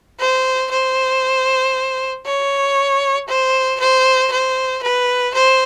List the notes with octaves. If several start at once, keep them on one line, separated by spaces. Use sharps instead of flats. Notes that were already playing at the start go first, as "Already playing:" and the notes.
C5
C5
C#5
C5
C5
C5
B4
C5